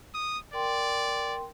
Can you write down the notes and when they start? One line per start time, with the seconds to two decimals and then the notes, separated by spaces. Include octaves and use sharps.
0.14 D#6
0.53 A#4 D5 G5 C6